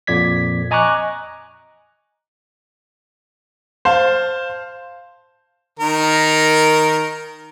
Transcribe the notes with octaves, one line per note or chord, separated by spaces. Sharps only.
F2 A#2 D5 G#6 B6
D#5 G#5 A#5 C#6 D6 F#6
C5 F5 A5
D#3 A#4